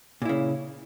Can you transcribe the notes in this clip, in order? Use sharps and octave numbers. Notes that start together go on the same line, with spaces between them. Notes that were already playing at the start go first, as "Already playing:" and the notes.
A#2 C#3 E4